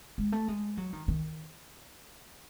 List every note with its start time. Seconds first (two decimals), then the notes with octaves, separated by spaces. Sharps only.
0.18 G#3
0.32 A3
0.48 G#3
0.77 F#3
0.93 D#3
1.08 D#3